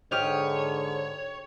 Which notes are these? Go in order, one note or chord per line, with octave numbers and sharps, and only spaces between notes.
G#2 D3 G4 C#5 D#6 F6